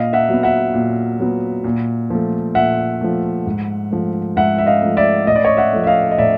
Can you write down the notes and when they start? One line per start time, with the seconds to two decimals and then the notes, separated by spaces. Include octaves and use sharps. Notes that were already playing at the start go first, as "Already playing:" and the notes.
Already playing: A#2 D#5 F5
0.13 E5 F#5
0.29 F#3 B3
0.43 E5 F#5
0.74 A#2
1.20 F#3 B3
1.64 A#2
2.10 F3 A3
2.55 A#2 E5 F#5
3.01 F3 A3
3.46 G#2
3.91 F3 A3
4.36 G#2 E5 F#5
4.58 E5
4.66 D#5 F5
4.81 F3 A3
4.97 D5 E5
5.27 A2 D#5
5.36 D5
5.44 C#5 D#5
5.57 E5 F#5
5.73 F3 A3
5.83 E5
5.87 D#5 F5
6.11 D#5
6.18 A2 D5 E5